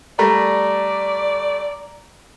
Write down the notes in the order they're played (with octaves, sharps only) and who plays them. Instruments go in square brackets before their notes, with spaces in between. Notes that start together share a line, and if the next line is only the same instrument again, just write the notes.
[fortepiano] G3 A3 [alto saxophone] D5 [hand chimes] A#5 A#6